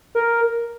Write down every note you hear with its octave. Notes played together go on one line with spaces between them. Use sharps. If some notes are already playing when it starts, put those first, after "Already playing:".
A#4